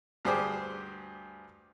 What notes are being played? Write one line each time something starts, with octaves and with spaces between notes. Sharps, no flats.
D2 G2 G4 G#4 C5 D6